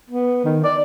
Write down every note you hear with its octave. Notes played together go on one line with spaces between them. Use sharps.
B3
D#3
D5